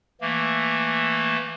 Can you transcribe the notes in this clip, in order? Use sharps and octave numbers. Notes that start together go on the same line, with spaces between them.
E3 A3 A#3